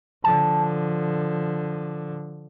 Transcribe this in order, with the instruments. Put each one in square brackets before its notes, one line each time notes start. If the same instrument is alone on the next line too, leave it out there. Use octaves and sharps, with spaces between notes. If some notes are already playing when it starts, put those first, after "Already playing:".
[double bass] D3 F3 [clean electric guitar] A5